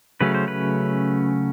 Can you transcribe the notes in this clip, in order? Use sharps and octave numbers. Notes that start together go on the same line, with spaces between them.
C#3 F#3 A3 C#4 B4
C5
B4